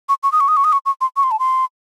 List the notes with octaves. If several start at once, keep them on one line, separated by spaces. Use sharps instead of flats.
C#6
C#6
D#6
C#6
D#6
C#6
D#6
C#6
C#6
C6
C#6
C6
A5
C6